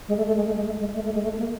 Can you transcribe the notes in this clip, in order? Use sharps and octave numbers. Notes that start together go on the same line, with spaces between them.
G#3
A3
A3
G#3
A3
G#3
A3
G#3
A3
A3
G#3
A3
A#3